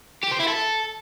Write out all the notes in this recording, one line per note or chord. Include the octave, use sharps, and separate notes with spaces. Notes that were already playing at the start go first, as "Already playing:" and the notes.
G4
C5
E4
A4